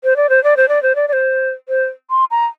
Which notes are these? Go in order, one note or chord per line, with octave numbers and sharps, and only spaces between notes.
C5
D5
C5
D5
C5
D5
C5
D5
D5
C5
C5
C6
A#5